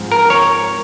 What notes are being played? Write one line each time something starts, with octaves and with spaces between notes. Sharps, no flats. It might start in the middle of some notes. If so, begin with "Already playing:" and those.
Already playing: G#2 F3 C4
A#4
C#5